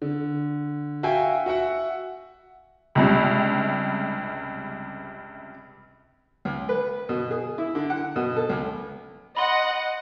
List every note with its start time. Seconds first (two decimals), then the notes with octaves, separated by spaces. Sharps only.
0.02 D3
1.03 F#4 E5 F5 G5 G#5
1.46 F#4 E5 F#5
2.95 C#2 G2 C3
6.45 C#2
6.69 B4
7.09 B2
7.31 G#4
7.58 E4
7.75 D3
7.90 F#5
8.16 B2
8.36 A4
8.49 C#2
9.37 D#5 F#5 B5 C6